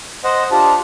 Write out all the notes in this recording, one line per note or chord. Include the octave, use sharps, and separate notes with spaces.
C5 D#5 F#5
D4 F4 G4 A5